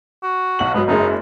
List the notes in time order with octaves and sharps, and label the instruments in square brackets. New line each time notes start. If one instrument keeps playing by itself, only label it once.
[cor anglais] F#4
[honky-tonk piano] B1 F#5 F#7
[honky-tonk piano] G#2 F#3 [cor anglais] B3
[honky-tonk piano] F#1 F#2 G#3 [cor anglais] D#4